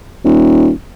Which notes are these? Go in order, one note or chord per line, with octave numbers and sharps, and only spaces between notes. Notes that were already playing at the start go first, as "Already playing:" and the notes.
D#1